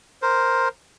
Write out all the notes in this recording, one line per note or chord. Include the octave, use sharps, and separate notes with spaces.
A#4 C5